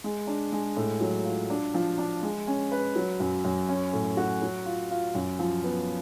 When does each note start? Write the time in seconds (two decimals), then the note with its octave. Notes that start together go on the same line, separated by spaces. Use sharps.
0.04 G#3
0.27 D4
0.52 G#3
0.77 A2
1.01 F#3
1.25 F4
1.50 D4
1.74 F3
1.98 D4
2.23 G#3
2.47 C#4
2.72 B4
2.96 F#3
3.20 F#2
3.45 F#2
3.69 C#4
3.93 A2
4.17 F#4
4.42 F#3
4.66 F4
4.91 F4
5.15 F#2
5.39 F3
5.64 B3